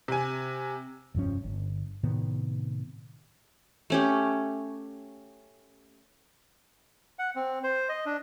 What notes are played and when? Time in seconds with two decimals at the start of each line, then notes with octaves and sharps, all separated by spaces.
0.08 C3 G#5
1.15 F1 G2 F3 C#4
1.44 G1
2.03 A2 C3 D#3 B3
3.90 A3 C#4 G4
7.19 F#5
7.35 C4
7.63 C5
7.89 D#5
8.06 D4